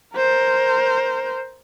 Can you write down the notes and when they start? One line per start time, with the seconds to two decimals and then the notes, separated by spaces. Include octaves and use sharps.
0.16 A#4 C5